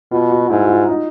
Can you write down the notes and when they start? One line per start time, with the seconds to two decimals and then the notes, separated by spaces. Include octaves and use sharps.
0.11 B2 F4
0.31 F#4
0.50 G#2 E4
0.64 F#4
0.70 F4
0.89 D#4